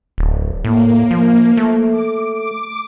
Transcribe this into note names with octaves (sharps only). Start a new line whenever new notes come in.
D1
A2 A#3
F3
A3
D6